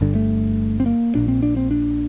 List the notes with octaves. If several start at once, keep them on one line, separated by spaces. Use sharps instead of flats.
G1 G2 D3
A3
C4
A#3
A#1 A#2 D4
C4
D4
C4
D4